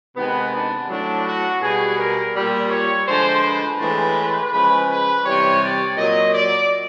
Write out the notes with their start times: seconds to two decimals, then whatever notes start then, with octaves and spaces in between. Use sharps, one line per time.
0.17 C3 D#3 G#3 B3
0.53 D4
0.89 A2 F#3 D4
1.26 F#4
1.62 B2 G3 G#4
1.98 A#4
2.35 A#2 G3
2.71 C#5
3.07 D3 F3 G#3 C5
3.43 B4
3.79 A2 E3 G#3
4.52 C#3 F3 G#3 B4
4.88 B4
5.24 C3 E3 G3 C#5
5.61 D5
5.97 A#2 F#3 D#5
6.34 D5